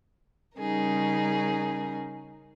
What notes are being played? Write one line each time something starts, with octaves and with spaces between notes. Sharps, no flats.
C#3 G3 C#4 D#4 G#4 A#4